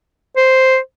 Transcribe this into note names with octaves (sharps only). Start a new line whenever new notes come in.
C5